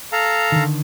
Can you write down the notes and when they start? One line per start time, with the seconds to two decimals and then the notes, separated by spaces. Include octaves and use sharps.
0.12 A4 F5 A#5
0.52 D3 D#3